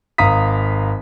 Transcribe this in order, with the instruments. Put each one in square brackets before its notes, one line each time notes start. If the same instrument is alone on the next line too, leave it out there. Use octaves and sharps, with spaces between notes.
[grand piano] G#1 F5 A#5 D#6 B6